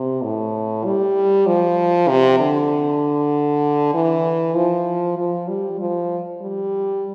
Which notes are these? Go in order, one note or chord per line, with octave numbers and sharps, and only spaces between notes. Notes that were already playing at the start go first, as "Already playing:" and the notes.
Already playing: C3
A2
G3
F3
C3
D3
E3
F3
F3
G3
F3
G3